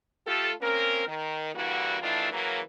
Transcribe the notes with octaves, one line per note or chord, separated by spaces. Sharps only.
A3 F4 G4 A4
A#3 C4 C#4 A#4
D#3
D3 E3 G3 A#3 E4 F#4
D#3 E3 A3 D4 E4 F4
C#3 E3 F#3 A#3